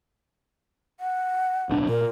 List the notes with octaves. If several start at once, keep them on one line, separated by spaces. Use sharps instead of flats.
F#5
D1 B1 D4
A#2 A#4